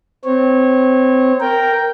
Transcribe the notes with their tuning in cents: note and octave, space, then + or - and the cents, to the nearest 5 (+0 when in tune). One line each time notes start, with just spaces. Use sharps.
C4 -20 C#5 -20
A#4 +0 G5 -5